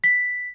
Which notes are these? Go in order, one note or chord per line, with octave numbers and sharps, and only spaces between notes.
B6